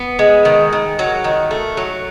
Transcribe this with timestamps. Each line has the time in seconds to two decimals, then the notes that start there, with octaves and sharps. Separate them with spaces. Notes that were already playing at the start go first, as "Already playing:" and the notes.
Already playing: B3
0.19 G#3
0.45 D#3
0.73 D#3
0.99 F#3
1.24 D#3
1.51 A3
1.77 F#3